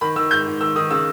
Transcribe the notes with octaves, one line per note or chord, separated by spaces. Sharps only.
D#3 B5
D#3 E6
G#2 G6
G#2
D#3 E6
D#3 D#6
C#3 E6